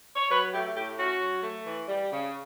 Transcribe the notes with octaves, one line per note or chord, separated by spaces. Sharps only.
C#5
F#3 B4
A3 G4
A2 G4
C#4 F#4
F#3
A3
E3
G3
C#3